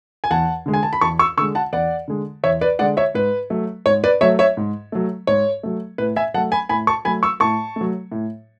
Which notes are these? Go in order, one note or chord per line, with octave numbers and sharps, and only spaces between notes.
G#5
E2 F#5 A5
D3 G#3
G#5
A5
B5
E2 A5 C#6
C#6 E6
D3 G#3 C#6 E6
F#5 A5
E2 D5 F#5
D3 G#3
E2 C#5 E5
B4 D5
D3 G#3 D5 F#5
C#5 E5
G#2 B4
F#3 A3
G#2 C#5
B4 D5
F#3 A3 C#5 E5
C#5 E5
G#2
F#3 A3
G#2 C#5
F#3 A3
A2 B4
E5 G#5
F#3 A3 F#5 A5
G#5 B5
A2 G#5 B5
A5 C#6
F#3 A3 G#5 B5
C#6 E6
A2 A5 C#6
F#3 A3
A2